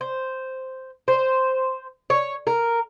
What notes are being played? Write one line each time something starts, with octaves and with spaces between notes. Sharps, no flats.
C5
C5
C#5
A#4